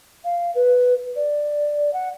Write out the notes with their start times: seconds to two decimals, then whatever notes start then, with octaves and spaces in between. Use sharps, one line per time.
0.24 F5
0.55 B4
1.16 D5
1.93 F#5